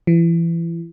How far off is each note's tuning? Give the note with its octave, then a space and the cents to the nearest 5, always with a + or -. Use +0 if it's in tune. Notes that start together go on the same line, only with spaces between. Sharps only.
E3 +30